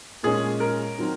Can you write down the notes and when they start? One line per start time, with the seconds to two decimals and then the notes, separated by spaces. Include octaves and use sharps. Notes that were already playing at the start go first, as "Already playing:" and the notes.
0.23 A#2 F3 G#3 C#4 G#4
0.60 A#4
0.98 D#3 F#3 C4